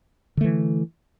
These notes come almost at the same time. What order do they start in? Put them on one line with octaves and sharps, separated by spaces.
D3 A3 E3